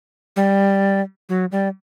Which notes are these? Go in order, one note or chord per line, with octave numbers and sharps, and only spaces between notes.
G3
F#3
G3